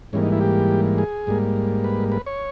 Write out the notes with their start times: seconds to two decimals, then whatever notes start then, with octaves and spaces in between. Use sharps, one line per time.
0.13 G#2 E3 G3 A#3 C#4
0.22 D#4
0.33 E4
0.41 G4
0.98 G#4
1.27 G#2 G3 A#3
1.84 B4
2.12 B4
2.26 C#5